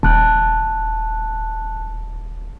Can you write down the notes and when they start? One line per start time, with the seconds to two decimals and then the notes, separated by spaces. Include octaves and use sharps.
0.03 D#1 A5 F#6